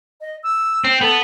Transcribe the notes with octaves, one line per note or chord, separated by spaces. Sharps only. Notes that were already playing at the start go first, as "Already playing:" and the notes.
D#5
E6
C4
B3 A4